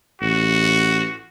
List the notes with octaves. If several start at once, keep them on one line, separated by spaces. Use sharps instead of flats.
A1 F#4